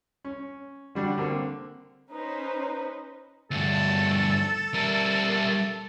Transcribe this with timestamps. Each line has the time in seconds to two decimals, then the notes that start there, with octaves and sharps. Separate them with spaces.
0.25 C#4
0.95 D3 G3 D4 F#4
1.18 D3 A#3 C4
2.09 C#4 D#4 B4 C5
3.51 D2 G2 A4
4.74 G3 A#4